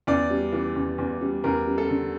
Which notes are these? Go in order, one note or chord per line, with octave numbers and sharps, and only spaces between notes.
E2 D5
G3
E3
E2
E2
G3
E2 A#4
G3
A4
D3